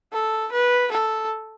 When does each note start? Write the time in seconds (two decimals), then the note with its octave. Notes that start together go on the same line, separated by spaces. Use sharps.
0.13 A4
0.52 B4
0.91 A4